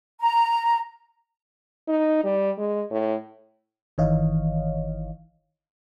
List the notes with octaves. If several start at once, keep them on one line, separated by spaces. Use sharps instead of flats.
A#5
D#4
G3
G#3
A2
G1 D#3 E3 C#5 D#5 F5